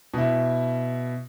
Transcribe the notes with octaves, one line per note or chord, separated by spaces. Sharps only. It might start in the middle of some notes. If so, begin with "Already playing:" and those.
B2 E4